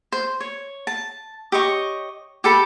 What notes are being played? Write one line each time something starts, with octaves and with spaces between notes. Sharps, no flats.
C5
C#5
A5
G4 C#5 D#5 C#6
G4 A4 B5